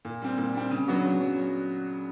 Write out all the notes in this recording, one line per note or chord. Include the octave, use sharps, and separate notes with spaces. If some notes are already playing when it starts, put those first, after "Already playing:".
A#2
G3 C4
A#2
G3 C4
C#3
F#3 B3 D4 F#4
C#3
F#3